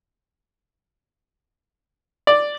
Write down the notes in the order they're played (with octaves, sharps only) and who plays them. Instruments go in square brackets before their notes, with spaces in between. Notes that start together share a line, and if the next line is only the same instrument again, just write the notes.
[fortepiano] D5